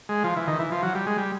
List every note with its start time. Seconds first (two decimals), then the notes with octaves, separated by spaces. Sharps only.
0.09 G#3
0.24 F3
0.36 E3
0.47 D#3
0.59 E3
0.72 F3
0.83 F#3
0.95 G3
1.06 G#3
1.18 G3